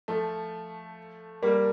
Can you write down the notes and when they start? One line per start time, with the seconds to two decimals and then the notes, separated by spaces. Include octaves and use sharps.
0.08 F3 A3
1.43 G3 A#3